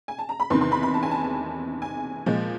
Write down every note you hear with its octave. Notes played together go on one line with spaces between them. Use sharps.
G#5
A5
A#5
B5
E2 C3 D#3 C6
C6
B5
B5
A5
G#5
A5
G#5
A#2 F3 G#3